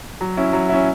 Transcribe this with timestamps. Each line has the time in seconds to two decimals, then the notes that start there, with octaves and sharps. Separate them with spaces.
0.21 F#3
0.37 C#4 E4
0.53 F#3
0.69 C#4 E4